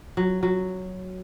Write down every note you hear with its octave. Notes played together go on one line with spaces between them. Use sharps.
F#3
F#3